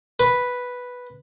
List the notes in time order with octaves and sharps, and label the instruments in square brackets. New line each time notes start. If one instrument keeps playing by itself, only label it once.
[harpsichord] B4